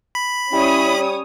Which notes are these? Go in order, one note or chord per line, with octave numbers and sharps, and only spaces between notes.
B5
G3 C#4 E4 C#5 D#6